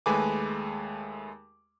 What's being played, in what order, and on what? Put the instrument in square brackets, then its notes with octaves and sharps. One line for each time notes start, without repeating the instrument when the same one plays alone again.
[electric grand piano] D#2 G#3 A3 B4 G#5 D6